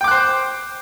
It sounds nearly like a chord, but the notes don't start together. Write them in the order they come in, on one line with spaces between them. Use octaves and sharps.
G5 D6 F#6 C5